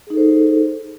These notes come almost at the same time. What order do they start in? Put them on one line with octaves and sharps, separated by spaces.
G#4 D#4 A4 C5